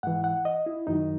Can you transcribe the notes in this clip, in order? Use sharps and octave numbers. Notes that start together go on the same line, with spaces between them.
G#2 E3 F#5
F#5
D#5
E4
F#2 D#3 F#3 D#4